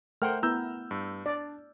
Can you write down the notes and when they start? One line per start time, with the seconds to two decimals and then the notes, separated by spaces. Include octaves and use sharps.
0.22 A3 A#4 C5 F#5 G5 F6
0.43 B3 E4 A#5 E6 G6
0.91 G2
1.26 D4 D5